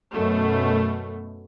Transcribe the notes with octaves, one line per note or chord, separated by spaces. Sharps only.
F#2 B2 A3